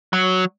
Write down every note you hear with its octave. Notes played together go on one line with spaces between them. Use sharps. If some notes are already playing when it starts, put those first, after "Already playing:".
F#3